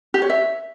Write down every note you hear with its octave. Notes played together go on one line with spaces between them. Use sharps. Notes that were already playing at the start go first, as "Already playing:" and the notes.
G4
C#5
E5